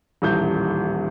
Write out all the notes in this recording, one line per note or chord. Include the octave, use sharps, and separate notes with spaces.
D#1 A1 G6